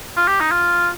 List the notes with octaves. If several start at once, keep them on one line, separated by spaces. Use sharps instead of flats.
F4
G4
D#4
F4